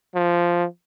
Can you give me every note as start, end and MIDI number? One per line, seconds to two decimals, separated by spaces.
0.15 0.65 53